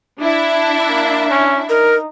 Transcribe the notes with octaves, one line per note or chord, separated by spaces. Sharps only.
D4 E4 E5
A#3
C#4
D#4 A#4